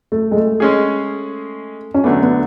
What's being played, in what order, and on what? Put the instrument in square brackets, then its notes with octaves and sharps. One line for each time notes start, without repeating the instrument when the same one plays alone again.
[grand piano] A3
G#3
A3
[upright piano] G#3 C#4 G#4
[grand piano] C#4
[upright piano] D3 F#3 A3 D4 [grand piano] B3
[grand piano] B3